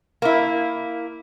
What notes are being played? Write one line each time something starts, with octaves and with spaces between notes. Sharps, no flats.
A#3 E4